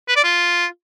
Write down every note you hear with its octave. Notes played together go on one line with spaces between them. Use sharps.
B4
D5
F4